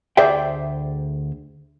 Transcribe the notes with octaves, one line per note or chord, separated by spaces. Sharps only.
D2 G#4 C5 D5 E5 G5